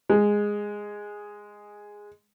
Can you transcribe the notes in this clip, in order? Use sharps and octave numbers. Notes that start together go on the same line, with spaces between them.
G#3